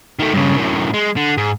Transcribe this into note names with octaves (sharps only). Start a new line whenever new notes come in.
D#3 A3
G2 C#3
F#2 A2
G#3
D3
G#2